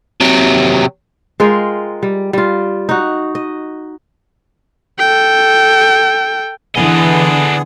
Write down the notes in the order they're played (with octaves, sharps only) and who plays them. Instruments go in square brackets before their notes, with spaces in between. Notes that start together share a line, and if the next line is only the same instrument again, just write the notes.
[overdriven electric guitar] C3 F#3
[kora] G#3 F4 A#4 G5
G3
G3 F4
D#4 F#4
D#5
[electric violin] A4 G5
[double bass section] D3 E3 [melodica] B3 G#4 [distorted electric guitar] D4 D#5